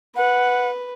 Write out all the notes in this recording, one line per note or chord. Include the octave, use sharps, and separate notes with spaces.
B4 F#5